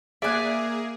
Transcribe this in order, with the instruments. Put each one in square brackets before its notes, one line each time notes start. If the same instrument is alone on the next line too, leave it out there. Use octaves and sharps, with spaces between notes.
[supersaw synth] A#3 G#4 [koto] D5 G#5 [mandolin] E5 F#6